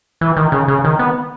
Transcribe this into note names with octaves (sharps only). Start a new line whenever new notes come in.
E3
D#3
C#3
C#3
D#3
B3